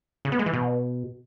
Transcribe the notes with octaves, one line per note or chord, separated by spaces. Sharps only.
C#3
B3
G#3
E3
B2